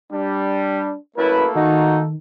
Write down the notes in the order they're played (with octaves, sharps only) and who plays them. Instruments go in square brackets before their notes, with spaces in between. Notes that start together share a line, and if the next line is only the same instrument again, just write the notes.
[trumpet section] G3 [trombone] D4
[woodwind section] F#2 E4 [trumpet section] A3 A#3 A4 [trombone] B4
[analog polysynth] D#3 [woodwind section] D#4 [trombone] F#4